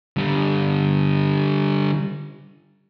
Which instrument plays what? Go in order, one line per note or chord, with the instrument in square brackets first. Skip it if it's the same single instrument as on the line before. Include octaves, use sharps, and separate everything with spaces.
[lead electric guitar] D3 G3